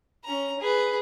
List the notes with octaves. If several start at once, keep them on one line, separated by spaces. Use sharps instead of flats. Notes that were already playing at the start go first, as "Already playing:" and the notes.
C#4 A#5
G#4 B4